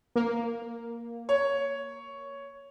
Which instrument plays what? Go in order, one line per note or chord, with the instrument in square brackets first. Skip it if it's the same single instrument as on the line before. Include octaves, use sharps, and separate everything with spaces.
[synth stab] A#3
[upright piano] C#5